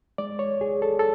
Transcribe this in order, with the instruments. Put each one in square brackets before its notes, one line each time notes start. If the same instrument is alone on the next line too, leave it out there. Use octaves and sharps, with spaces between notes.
[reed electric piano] G#3 D5
C#5
C2 G#4
A4
A4